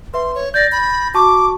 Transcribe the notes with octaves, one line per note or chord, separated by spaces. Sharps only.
B4 E5 C6
C#5
D5 G6 A6 A#6
B5
F#4 A5 C#6 D6